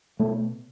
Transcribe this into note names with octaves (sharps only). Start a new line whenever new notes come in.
B2 A3